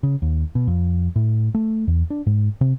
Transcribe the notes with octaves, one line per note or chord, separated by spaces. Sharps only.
C#3
D#2
B2
F2
A2
A3
E2
D4
G#2
C3